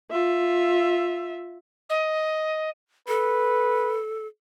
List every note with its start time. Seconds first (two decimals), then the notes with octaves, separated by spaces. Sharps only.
0.11 F4 E5
1.89 D#5
3.08 A4 B4